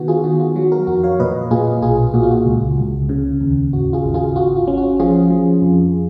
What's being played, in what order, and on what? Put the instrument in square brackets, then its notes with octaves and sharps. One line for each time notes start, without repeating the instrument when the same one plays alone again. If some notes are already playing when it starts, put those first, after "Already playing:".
Already playing: [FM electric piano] D#3 B3 F#4
F4 G#4
D#3 F#4
F4
F#3 F#4
F#4 A#4
F2 F#4
C#5 F5
A#2 B4 D#5
A#2 F4 G#4
B1 F4 G#4
A#2 F#4
F4
F#4
C#2
C#2
C#3
D#2
G#1 F#4
F4 G#4
G#1
F4 G#4
F4 F#4
F4
C#4
F#4
F3 F4 G#4
F3
F2